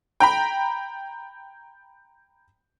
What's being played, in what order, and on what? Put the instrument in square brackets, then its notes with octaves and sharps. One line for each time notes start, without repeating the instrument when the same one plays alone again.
[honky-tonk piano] G5 A#5 B5